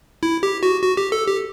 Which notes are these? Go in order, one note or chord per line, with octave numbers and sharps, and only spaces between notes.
E4
G4
F#4
F#4
G4
A4
G4